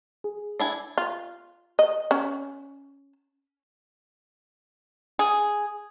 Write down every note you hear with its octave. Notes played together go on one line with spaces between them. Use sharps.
G#4
D4 E4 G#5
F4
D#5
C#4
G#4